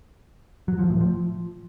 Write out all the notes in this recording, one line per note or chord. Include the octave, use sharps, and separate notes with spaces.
F#3
F3
A2
F3